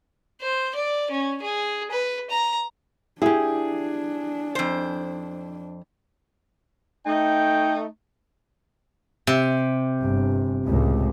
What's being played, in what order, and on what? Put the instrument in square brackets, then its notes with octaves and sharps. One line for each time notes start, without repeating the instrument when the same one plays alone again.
[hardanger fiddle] C5
D5
C#4
G#4
B4
A#5
[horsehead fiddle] D4 [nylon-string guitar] E4 G4 [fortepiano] G#4
[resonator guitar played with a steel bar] F2 C5
[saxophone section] A3 D#4 [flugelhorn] G5
[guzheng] C3
[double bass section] G1
C#2 A2